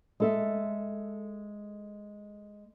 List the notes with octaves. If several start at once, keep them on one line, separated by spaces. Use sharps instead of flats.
G#3 A4 E5